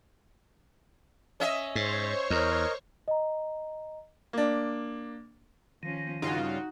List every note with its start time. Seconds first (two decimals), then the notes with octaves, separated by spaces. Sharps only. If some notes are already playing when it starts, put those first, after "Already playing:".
1.40 C#4 D#5 E5
1.75 G#2 C5 C#5 C#6
2.30 E2 A#4 D#5
3.08 D#5 A#5
4.33 A#3 D4
5.83 D#3 F3 C#4
6.22 G2 C#3 D#4 F4 F#4 F#5